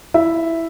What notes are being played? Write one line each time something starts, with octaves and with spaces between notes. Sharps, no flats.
E4 E5